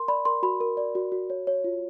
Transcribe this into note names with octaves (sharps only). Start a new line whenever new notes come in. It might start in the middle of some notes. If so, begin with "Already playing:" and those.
Already playing: A#4 C6
D5 B5
A#4 C6
F#4 B5
A#4
D5
F#4
F#4
C#5
C#5
F4